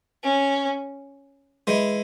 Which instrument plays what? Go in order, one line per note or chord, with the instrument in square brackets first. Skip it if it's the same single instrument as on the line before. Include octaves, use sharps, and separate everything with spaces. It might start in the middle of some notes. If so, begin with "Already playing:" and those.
[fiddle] C#4
[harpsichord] E3 G#3